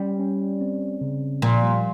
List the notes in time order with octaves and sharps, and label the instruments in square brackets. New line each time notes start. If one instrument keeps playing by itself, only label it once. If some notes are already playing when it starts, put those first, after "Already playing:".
Already playing: [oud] G3 [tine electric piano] C#4
[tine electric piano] C#4
C4
C#3
[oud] A#2 [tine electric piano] F3
[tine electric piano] G3